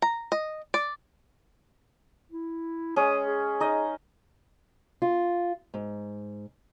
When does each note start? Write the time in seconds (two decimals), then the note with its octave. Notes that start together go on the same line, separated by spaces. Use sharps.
0.02 A#5
0.32 D#5
0.74 D5
2.31 E4
2.96 G#3 C#4 D#6
3.24 G#4
3.60 D#4 D#5
5.02 F4
5.74 G#2